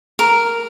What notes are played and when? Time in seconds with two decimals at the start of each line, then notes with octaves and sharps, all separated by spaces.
0.19 A#4